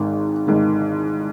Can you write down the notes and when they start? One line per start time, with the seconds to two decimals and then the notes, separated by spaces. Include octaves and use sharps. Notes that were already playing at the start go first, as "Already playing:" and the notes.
Already playing: G#1 G#2 D#3
0.47 G#1 G#2 D#3